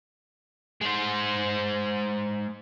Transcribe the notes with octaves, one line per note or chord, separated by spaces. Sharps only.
G#3 C5